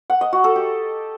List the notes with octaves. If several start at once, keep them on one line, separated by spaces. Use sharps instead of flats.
F#5
D#5
F#4
A4
G4